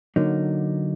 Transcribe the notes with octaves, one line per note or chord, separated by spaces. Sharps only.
D3 F#3 A#3 D#4